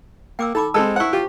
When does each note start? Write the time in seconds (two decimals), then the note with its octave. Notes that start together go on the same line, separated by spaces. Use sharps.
0.39 A#3 G5 D6 E6
0.55 D#4 A4 B5 D6
0.74 G#3 C4 A4 A5 E6
0.96 E4 C5 F#5 C#6
1.13 F4 G4